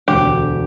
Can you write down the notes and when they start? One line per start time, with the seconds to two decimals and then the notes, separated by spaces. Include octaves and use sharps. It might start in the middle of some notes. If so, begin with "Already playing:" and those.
0.08 E1 D2 D3 G4